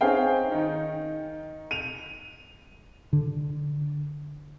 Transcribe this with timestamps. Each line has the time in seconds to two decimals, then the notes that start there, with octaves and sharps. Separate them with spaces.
0.01 C4 C#4 D#4 G#4 F5 G5
0.52 D#3 D#4
1.71 D#7 F7
3.13 D3